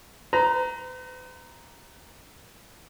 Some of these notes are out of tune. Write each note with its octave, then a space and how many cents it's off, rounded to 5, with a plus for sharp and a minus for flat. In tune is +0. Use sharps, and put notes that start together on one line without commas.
B4 +45 A#5 +0